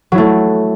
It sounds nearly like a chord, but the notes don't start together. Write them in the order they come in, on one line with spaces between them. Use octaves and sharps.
F#3 E4 A3